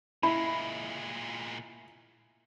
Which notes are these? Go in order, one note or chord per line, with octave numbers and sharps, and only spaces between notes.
A#2 G#3 E4 B5